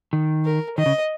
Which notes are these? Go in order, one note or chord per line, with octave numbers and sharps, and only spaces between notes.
D#3
A#4
D#3 D#5
C#3